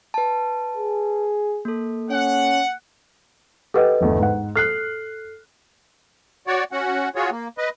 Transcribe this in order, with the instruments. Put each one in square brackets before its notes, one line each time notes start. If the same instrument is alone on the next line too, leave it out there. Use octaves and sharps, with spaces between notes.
[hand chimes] B4 A5
[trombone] G#4
[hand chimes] A#3 A4
[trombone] C#4 [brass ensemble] F#5
[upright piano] G4 F#5 [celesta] A4 B4 D#5
[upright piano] G1 E2 A3
G#2 F#5
[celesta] A4 C7 [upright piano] F6 F#6
[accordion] F#4 C#5 D5
C#4 F#4 F#5
F4 F#4 G#4 C#5
A#3
B4 D#5